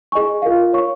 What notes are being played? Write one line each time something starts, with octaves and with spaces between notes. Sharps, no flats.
G#4 D#5 G#5 C#6
F4 A#4 F5
C#5 F5 C#6